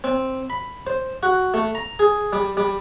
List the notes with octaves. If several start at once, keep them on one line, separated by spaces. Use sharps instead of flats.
C4
B5
C5
F#4
A3
A#5
G#4
G3
G3